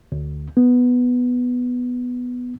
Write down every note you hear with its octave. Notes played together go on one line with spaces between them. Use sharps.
D2
B3